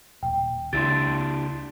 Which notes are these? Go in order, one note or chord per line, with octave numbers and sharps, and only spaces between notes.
D#1 G5
C#2 D4 E4 G4 C6 A6